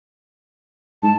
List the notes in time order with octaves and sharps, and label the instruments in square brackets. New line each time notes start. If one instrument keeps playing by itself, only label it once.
[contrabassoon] G#2 [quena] A5